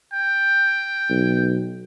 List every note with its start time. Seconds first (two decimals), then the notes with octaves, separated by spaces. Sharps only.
0.13 G5
1.10 B1